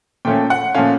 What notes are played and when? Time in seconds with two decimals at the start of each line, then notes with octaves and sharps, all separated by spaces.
0.25 A#2 F3 A3 C#4 G5
0.50 F#5
0.75 A#2 F3 A3 C#4 F5